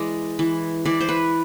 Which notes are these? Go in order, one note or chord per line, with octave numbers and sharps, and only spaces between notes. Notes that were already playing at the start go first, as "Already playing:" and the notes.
Already playing: E3 G#3 D5
E3
E3 D5
C5
B4